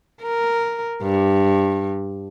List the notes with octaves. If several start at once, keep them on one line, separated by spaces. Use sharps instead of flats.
A#4
G2